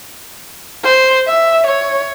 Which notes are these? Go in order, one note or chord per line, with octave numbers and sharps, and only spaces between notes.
C5
E5
C#5